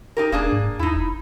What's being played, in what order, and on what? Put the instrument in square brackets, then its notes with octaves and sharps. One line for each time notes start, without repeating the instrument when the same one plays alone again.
[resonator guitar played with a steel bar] D#4 G4 A#4
[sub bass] E1 [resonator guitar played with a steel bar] A#3 D4 G#4
[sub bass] G#2
[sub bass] E2 [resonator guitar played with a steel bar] D#4 E4
[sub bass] F1